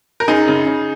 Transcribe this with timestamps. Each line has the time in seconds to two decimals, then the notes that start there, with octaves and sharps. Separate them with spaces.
0.20 A#4
0.28 F#2 D#4 G#4
0.47 C#3
0.67 C#3